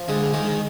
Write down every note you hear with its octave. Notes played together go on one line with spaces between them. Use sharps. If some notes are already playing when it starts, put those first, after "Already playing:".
Already playing: F3
D3 G#3
D#3 G#3